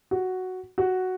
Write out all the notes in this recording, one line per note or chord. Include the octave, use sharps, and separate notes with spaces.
F#4
F#4